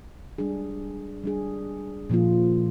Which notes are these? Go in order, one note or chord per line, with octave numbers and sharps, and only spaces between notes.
G3 D4 G#4
G3 D4 G#4
A#2 F3 A#3 F4